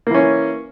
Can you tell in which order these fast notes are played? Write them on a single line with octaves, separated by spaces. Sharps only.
A#3 E3 C#4